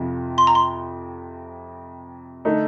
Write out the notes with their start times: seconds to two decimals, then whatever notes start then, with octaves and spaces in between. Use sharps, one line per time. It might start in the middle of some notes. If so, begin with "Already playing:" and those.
Already playing: F2 C3 F3
0.38 C6
0.47 A#5
0.55 C6
2.45 D3 A3 D#4